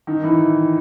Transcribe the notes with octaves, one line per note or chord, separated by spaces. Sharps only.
D#3
E3